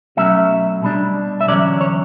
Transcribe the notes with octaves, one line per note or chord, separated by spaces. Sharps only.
B2 F#3 A3 C#4 E5
B2 G3 D4
E5
E2 D3 F#3 C#4 D5
C#5